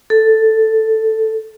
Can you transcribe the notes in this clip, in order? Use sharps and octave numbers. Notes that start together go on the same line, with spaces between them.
A4